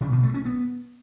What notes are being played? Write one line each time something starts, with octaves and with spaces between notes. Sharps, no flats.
C#3
B2
A3
C#4
B3